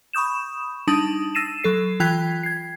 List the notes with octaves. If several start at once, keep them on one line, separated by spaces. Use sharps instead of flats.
B5 C#6 D#6 G6 E7
G3 D4 D#4 A5 D#6 F#7
E6 A6 A#6 C7 D#7 E7
F#3 A4 C7
E3 F4 G5 F#6 G#6 B6
G#6 C7